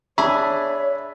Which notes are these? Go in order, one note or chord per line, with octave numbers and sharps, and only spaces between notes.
D4 G#4 C#5 E5 B5